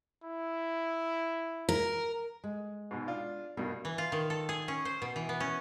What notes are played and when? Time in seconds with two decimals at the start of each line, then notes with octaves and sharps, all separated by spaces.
0.24 E4
1.69 A#4
2.44 G#3
2.91 G#2 B2
3.07 D4 F4
3.57 G2 B2 A#4
3.85 E3
3.98 F4
4.12 D#3
4.30 A4
4.49 G#4
4.68 C#4
4.85 C5
5.02 B2
5.16 E3
5.29 B3
5.40 C#4